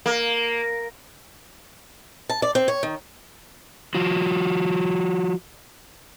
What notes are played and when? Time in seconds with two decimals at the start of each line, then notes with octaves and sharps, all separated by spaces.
0.06 A#3
2.29 A5
2.42 D5
2.55 C4
2.68 C#5
2.83 D#3
3.95 F3 F4 F#4